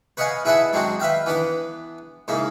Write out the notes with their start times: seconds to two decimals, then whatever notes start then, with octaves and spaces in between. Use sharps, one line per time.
0.17 B4 C#5 D#5 F5 F#5 G#5
0.45 E4 G#4 B4 E5 F#5 A5
0.73 F#3 G#3 C4 D4 F#4
1.00 B4 E5 F5 G5
1.26 E3 B3 D4 D6
2.28 G#2 C#3 A#3 E4